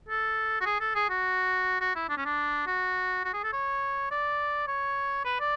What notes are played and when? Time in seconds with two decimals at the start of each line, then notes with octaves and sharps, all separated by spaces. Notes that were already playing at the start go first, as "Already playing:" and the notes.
0.09 A4
0.61 F#4
0.66 G#4
0.81 A4
0.95 G#4
1.10 F#4
1.81 F#4
1.96 E4
2.09 D4
2.17 C#4
2.25 D4
2.67 F#4
3.25 F#4
3.34 G#4
3.44 A4
3.53 C#5
4.11 D5
4.68 C#5
5.25 B4
5.40 D5